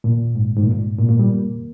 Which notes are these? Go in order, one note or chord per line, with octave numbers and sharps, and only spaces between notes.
A#2
G#2
G#2
A#2
G#2
A#2
A#2
G3
A#3